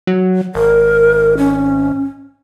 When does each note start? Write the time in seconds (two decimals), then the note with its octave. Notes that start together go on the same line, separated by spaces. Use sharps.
0.07 F#3
0.55 G#1 A#4
1.38 C#4